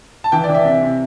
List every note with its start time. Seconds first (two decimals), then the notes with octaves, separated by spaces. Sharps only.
0.24 A5
0.32 E3 G5
0.44 D5
0.49 E3 E5
0.65 C3 E5
0.82 C3